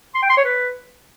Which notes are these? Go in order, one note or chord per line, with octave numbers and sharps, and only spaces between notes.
C6
G5
C6
C#5
B4